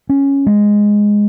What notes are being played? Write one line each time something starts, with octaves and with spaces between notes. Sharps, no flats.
C#4
G#3